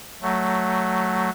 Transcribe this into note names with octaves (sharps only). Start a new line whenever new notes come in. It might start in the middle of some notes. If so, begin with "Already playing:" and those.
F#3 A3